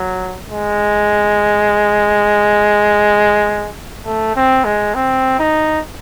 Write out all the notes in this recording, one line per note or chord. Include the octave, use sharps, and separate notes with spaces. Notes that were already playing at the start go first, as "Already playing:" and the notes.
Already playing: F#3
G#3
A3
C4
G#3
C4
D#4